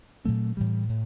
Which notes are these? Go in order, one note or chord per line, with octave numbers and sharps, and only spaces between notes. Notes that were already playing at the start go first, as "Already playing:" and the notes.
A#2 F#3 A3 C4
A2 E3 G3
A2